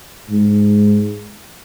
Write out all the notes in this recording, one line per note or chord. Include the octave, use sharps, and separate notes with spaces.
G#2